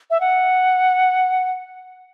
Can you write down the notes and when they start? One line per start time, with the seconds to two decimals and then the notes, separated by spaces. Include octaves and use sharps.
0.10 E5
0.20 F#5